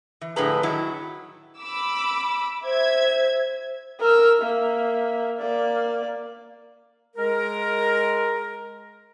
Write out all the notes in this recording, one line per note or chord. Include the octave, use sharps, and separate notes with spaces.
E3
A2 D3 F3 G#4 B4 A#5
D#3 F#3 E4
B5 D6 E6
C5 E5 G#6
A#4 E6
A#3 E5
A#3 D5
G#3 A#4